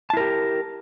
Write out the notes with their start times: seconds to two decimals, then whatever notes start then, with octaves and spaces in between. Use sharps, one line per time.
0.10 A5
0.13 E4
0.17 A#4
0.20 G4